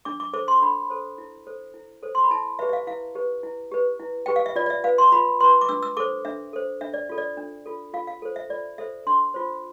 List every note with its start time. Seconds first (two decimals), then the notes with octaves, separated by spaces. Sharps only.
0.05 D4 D6
0.20 D6
0.33 A4 C5 D6
0.48 C6
0.62 D4 B5
0.90 A4 C5
1.18 E4
1.47 A4 C5
1.74 E4
2.03 A4 C5
2.15 C6
2.23 B5
2.31 E4 A5
2.59 G4 B4 E5
2.69 E5
2.73 F5
2.87 E4 F5
3.15 G4 B4
3.43 E4
3.72 G4 B4
3.99 E4
4.26 G4 B4 G5
4.36 F5
4.46 E5
4.56 F4 D5
4.66 D5
4.70 E5
4.84 B4 F5
4.98 C6
5.12 F4 B5
5.40 B4 C6
5.61 D6
5.69 D4 E6
5.83 E6
5.97 A4 C5 D6
6.25 D4 E5
6.53 A4 C5
6.81 D4 E5
6.94 D5
7.09 F4 A4
7.18 D5
7.37 D4
7.66 F4 A4
7.94 F4 F5
8.07 F5
8.22 A4 C5
8.36 E5
8.50 F4 D5
8.78 A4 C5 E5
9.07 D4 C6
9.34 F4 C5